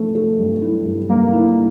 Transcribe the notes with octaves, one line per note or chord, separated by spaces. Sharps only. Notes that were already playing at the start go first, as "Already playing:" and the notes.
Already playing: F3 A3
A3
G2
E4
G2
G2 A#3
E4